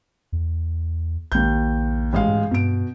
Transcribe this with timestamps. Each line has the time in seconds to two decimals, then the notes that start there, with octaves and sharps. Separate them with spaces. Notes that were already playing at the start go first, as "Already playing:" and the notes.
0.32 E2
1.32 A#1 D#2 G6
2.13 A1 G#3 F5
2.28 G#2
2.51 G2 B2 D7